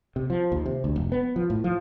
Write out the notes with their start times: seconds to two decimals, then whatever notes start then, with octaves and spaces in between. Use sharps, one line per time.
0.16 C3
0.30 F3
0.52 D#2
0.66 C3
0.84 D2
0.96 F1
1.12 B3
1.36 F3
1.50 A2
1.64 F3